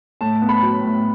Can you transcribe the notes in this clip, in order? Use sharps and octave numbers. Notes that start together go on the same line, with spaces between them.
A2 A5
B3
B5
F#3
A2